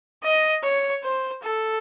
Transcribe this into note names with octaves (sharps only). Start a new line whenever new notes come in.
D#5
C#5
C5
A4